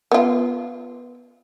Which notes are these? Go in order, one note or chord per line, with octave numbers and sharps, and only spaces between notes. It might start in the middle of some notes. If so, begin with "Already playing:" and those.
B3 F4